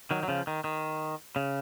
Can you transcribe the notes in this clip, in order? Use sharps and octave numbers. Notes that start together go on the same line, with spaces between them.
D#3 F#3
F#3
C#3 F3
D#3
D#3
C#3